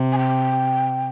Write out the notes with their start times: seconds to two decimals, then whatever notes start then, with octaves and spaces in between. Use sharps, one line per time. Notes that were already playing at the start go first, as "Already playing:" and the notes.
Already playing: C3
0.13 G#5
0.19 G5